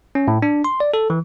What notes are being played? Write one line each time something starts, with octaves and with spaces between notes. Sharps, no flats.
C#4
A2
D4
C6
D5
A4
E3